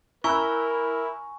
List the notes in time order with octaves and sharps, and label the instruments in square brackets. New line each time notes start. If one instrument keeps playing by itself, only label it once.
[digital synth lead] E4 [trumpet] A#4 [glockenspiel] G#5 C#6 [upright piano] A#5 E6 F#6